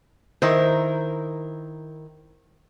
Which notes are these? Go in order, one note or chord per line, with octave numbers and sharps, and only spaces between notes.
D#3 E4 A#4 C5